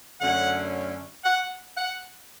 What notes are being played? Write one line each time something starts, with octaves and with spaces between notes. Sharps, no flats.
F#2 D3 A3 C#4 F#5
F#5
F#5